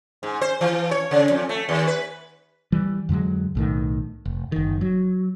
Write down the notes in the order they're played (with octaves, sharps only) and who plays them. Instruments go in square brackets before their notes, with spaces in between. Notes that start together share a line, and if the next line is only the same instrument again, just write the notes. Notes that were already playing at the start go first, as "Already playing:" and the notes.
[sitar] G#2
C5
E3
C#5
C#3
F2
A3
D#2
B4
[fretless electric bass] E3 G3
F2 D3 F#3 G#3
B1 A2 D#3
F1
F#1 D#3
F#3